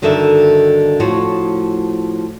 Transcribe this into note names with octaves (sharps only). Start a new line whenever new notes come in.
G2 D3 D#3 F#4 A4 E5
A2 F3 F#4 C#5